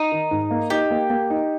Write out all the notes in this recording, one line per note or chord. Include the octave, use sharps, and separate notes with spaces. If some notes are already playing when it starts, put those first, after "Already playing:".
Already playing: D#4
D#3
G#2
A#3
D#4 G4
A#3
A#3
D#4